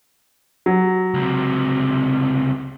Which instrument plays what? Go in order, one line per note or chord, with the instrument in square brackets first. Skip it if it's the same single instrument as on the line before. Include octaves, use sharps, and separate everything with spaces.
[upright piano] F#3
[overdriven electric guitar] C#2 C3